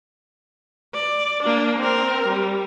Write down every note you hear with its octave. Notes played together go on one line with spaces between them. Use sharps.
D5
A#3 D4
C4 A#4
G3